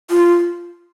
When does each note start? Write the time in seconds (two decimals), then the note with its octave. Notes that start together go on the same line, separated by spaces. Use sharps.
0.10 F4